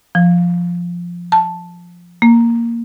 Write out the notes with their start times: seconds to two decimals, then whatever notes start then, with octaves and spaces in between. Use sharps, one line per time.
0.15 F3
1.32 A5
2.22 A#3